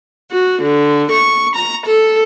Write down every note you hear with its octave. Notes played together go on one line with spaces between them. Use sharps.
F#4
D3
C#6
A#5
A4